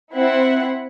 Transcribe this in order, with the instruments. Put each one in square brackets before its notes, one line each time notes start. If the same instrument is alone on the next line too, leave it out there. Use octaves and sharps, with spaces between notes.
[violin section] C4 E4 F#5